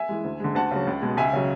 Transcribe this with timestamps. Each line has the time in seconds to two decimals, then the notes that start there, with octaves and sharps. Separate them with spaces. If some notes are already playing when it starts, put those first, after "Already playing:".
Already playing: E5 G#5
0.09 E3 G#3
0.24 D2
0.40 D3 G#3
0.55 D2 F#5 A5
0.71 C#3 F#3
0.87 C#2
1.02 B2 G#3
1.17 C#2 E5 G#5
1.33 C#3 F#3